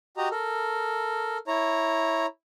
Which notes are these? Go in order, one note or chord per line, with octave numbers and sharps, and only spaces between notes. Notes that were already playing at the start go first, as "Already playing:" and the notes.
F#4 G4 D#5 A#5
A4 A#4
E4 C#5 A#5